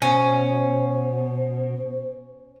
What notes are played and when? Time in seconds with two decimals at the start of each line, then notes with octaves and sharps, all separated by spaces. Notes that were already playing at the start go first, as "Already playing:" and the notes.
0.02 B2 C#4 C5